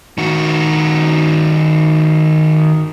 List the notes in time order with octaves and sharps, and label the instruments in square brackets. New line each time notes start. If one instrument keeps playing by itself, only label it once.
[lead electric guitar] D#3 F#4